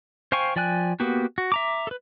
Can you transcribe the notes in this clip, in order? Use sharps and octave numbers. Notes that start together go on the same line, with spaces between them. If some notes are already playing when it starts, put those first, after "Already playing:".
C5 F5 G5 G#5 C#6
F3 D5 G5 G#5 F#6
A#3 B3 F#4 G4
F#4
E5 A#5 D6
A4 B4